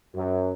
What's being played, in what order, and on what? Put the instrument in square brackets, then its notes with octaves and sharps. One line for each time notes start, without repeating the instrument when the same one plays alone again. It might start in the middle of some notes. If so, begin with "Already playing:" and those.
[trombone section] F#2